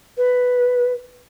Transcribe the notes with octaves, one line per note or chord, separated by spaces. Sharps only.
B4